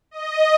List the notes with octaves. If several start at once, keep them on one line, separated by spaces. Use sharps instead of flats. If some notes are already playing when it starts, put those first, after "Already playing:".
D#5